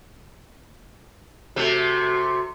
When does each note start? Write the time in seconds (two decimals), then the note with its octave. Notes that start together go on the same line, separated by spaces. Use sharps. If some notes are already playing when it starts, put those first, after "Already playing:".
1.56 C3 A3 F#4